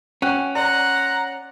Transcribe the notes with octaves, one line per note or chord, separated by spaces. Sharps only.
C#4 F#5 G5 F#6
D5 F#5 A#5 C6